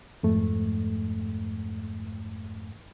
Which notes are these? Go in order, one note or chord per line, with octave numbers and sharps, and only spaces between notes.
F2 G#2 A3